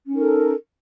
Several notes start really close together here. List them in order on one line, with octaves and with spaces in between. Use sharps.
C#4 D#4 A#4 A4